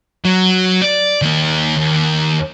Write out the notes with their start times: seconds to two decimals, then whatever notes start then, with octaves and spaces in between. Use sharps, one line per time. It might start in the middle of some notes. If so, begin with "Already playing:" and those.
0.25 F#3
0.82 D5
1.22 D#3 A#3
1.76 D#2